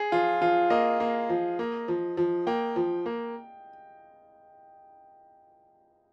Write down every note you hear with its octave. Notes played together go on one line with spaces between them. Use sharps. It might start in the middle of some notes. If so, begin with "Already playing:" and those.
Already playing: G#4
F3 F4
F3 F4
A#3 D#5
A#3
F3
A#3
F3
F3
A#3 G5
F3
A#3